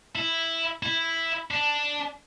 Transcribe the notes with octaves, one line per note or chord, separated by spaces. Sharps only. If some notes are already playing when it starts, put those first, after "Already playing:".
E4
E4
D4